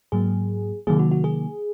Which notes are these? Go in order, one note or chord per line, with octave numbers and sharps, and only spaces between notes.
G#2 F#3 A#3 G#4
C3 D#3 F#3 A#3 G#4
F#4
F#4
G#4